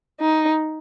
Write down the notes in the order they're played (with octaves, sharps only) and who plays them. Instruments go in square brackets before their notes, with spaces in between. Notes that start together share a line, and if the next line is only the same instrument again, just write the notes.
[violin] D#4